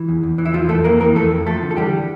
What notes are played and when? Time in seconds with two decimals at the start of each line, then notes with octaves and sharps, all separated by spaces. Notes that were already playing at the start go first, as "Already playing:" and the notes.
Already playing: E3
0.08 E2
0.23 E2
0.38 E3
0.45 E4
0.53 E3 F3 F4
0.69 F2 A3 A4
0.84 F2 A#3 A#4
1.00 E3 A#3 A#4
1.15 F2 A3 A4
1.31 F2
1.46 F3 A3 A4
1.62 D3
1.71 A4
1.77 E3 G3 G4